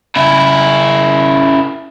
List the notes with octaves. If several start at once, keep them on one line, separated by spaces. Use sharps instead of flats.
C#3 E4